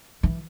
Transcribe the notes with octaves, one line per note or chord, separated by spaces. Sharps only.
E3